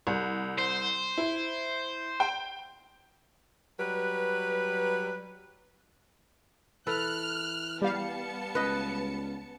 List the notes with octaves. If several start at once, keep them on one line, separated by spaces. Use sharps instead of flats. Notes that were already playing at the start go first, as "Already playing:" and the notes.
C2
C5
E4
G5
F#3 G3 B4
E3 A4 B4 F6 F#6
G3 B3 F5 A5 C#7
C#2 B4 D#5